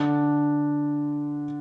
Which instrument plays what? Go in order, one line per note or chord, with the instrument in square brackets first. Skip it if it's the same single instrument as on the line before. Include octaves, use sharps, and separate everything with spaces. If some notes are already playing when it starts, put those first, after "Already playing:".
Already playing: [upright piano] D3 D4